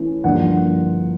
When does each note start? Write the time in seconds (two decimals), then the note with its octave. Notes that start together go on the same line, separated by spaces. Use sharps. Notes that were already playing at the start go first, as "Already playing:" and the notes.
Already playing: E3 A3 C#4 E4
0.24 G2 D3 F3 A#3 F#5